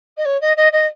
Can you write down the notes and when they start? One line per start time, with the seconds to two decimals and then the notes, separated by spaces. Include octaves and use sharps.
0.17 D#5
0.25 C#5
0.41 D#5
0.57 D#5
0.72 D#5